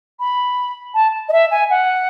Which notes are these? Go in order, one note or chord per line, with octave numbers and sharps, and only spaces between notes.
B5
A5
D#5
E5
G#5
F#5